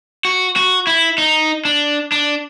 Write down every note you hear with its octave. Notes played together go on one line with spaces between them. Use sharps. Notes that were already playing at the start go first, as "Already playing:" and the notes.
F#4
F#4
E4
D#4
D4
D4